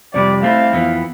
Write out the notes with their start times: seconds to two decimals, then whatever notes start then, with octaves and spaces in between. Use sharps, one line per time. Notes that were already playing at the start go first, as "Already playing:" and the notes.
0.13 F2 C3 G3 D5
0.43 A3 C4 E4 F5
0.73 F2 E3 B3